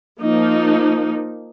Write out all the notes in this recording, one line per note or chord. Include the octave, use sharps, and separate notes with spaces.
F3 A#3 D#4